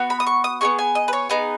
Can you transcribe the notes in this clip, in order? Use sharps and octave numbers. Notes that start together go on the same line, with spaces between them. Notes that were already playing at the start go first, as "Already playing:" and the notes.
Already playing: B3 F#4
B5
D#6
C#6
D#6
B3 D#4 G#4 C#6
G#5
D#5
B4
C#5
B3 D#4 G#4 B4